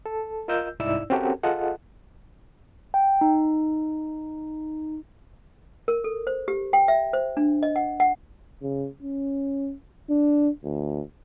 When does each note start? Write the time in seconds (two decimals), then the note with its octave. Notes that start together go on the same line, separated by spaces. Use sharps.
0.06 A4
0.48 F4 A#4 D#5 E6 G6
0.80 C2 G#2 D#4 E4 D5 E6
1.10 C4 C#4 F#4 G4 A4 A#4
1.43 F4 G#4 A4 D#5 F#5
2.94 G5
3.21 D#4
5.88 A#4
6.04 A4
6.27 C5
6.48 G4
6.73 G5
6.88 E5
7.13 C5
7.37 D4
7.63 D#5
7.76 F#5
8.00 F#5
8.62 C#3
9.03 C#4
10.10 D4
10.64 D2